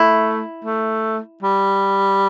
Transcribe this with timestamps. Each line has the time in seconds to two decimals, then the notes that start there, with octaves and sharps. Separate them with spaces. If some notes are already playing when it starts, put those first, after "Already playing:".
Already playing: A3 E4
0.65 A3
1.43 G3